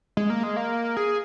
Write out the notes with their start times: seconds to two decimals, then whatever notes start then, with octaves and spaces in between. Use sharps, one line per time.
0.17 G#3
0.30 A#3
0.43 G#3
0.57 A#3
0.97 G#4